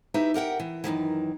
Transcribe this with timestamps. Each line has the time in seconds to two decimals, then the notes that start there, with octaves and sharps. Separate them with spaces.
0.14 D#4 E4 G4 B4 E5
0.34 G4 A#4 F#5 G5
0.60 E3
0.84 F#2 A2 D#3 E3